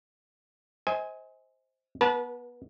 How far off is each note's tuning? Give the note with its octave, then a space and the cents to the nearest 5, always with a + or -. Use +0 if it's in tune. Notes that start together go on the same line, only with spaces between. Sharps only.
C5 +0 D#5 +40 G#5 +0
B3 -20 B4 -45 A5 -25